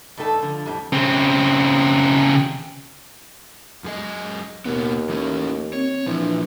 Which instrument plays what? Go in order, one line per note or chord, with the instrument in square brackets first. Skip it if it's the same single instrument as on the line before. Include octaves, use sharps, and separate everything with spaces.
[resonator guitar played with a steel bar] G2 A3 D#4 A4 A5
D3 F3
F2 A2 G3
[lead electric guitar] C#3 C4
[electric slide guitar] F#2 G#4 D#5
[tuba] D#2 [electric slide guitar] B2 A#3 B3
[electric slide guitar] E3 A3 C#4
[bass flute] C4 [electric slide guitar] C#5
[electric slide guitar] A#2 F3 [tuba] E3 [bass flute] D4